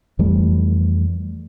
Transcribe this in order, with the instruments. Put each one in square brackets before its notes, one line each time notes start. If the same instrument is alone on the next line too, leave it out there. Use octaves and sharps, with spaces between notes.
[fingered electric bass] F2 E3 G3 A3